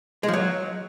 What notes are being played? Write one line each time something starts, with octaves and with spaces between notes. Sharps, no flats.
G#3
F3
F#3